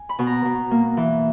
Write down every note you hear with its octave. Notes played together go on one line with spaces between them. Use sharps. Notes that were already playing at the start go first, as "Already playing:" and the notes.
Already playing: G#5
B5
B2
A#5
B2
A#3
E3